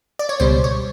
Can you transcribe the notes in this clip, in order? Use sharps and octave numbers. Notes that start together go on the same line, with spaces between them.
D5
C#5
C#2 B2 G3 C5
C#5